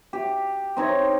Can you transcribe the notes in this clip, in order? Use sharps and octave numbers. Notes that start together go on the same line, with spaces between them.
G4
C4 D#4 C#5